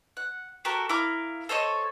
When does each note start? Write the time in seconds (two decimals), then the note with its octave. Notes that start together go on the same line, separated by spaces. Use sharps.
0.17 F#5
0.65 F#4 G4 A4 A#4
0.89 E4 A#4 F5 D6
1.49 A4 C5 C#5 D#5